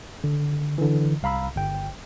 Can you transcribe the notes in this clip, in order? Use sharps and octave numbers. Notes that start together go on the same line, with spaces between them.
D3
D3 E3
C2 F5 A#5 B5 E6
G1 G5